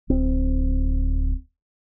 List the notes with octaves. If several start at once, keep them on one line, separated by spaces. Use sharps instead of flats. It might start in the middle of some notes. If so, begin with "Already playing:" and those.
D1 C4